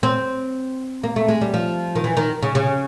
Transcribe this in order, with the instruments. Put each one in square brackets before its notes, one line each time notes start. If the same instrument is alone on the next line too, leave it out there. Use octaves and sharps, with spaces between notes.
[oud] C4
A#3
A3
G#3
G3
F3
D#3
E3
D#3
C#3
C#3